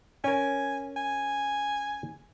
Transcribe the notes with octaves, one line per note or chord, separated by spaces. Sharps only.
C#4 A#4 G#5
G#5